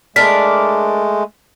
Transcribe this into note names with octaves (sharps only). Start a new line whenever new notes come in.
G#3 A3 D4 A#4 D5 B6